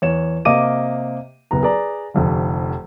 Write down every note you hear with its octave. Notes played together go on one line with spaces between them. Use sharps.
E2 C#5 E7
C3 A#3 D#5 F5 D6 D#7
F#1 B3 A#5
G#4 B4 D5 A#5
F1 F2 D3